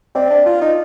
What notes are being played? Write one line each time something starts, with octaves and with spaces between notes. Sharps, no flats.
C4 D5
D4
F4
D#4